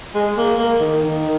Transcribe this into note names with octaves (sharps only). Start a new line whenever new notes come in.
G#3
A#3
A#3
D#3
D#3